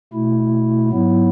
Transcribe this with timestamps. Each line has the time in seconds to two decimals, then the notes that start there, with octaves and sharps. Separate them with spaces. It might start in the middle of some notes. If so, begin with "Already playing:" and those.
0.13 B2 A3 E4
0.90 G#2 F#3 B3 E4